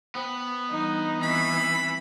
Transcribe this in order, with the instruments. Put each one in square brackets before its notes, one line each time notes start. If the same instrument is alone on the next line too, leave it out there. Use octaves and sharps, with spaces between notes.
[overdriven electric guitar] B3 [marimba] C5 G5 D#6
[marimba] E3 G3 D4 [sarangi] D#4
[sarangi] E3 [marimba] C4 C#6 [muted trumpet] B5